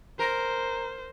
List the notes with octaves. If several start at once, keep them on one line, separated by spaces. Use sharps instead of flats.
A#4 C5